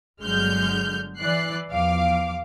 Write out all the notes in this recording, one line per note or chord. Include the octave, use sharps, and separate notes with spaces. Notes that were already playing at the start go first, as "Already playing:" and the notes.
G1 D3 F#3 G#3 F6 G6
E3 D5 F#6 C7
E2 F3 F5 D6